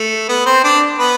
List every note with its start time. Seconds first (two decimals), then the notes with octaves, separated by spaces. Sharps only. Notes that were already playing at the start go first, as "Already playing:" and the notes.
Already playing: A3
0.29 B3 B4
0.46 C4 C5
0.63 D4 D5
0.99 B3 B4